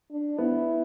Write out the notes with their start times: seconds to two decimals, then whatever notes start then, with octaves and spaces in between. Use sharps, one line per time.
0.11 D4
0.38 B3 E4